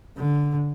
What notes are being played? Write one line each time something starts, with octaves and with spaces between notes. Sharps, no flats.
D3